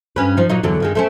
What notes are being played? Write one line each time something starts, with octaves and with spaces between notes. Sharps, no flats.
G2 C#4 B4
F3 D#4
A#2 F#3 D#4
E2 D3 F#3
G2 D#3 G#3
A3 C4 C#4